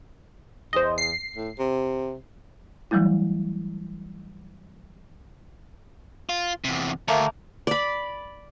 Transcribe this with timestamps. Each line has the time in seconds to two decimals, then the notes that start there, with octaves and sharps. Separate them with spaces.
0.73 E2 C5 D#5
0.98 C7
1.36 A2
1.59 C3
2.91 E3 F#3 G3 A3 E4
6.29 F4
6.64 E2 C3
7.08 D2 A3 A#3
7.67 D5 B5